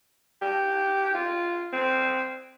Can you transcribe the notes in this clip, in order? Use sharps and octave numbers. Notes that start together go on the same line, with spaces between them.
G4
F4
C4